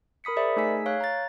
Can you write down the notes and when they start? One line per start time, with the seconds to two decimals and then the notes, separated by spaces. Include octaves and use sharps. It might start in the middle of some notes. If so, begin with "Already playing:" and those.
0.24 A#4 B5 D#6 B6 C#7
0.36 G#4 A#4 C5 D5 E5 B5
0.56 A3 D#4 G#4 G#5 E6 B6
0.86 C#5 F5 F#6 G#6
1.00 A#5 A6